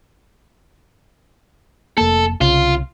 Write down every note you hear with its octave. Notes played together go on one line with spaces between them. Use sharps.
F1 A#3 A4
C2 C#3 F4